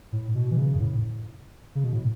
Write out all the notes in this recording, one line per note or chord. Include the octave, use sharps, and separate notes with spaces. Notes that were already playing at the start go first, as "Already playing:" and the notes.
A2
B2
E3
C#3
F#2
A2
C#3
B2
A2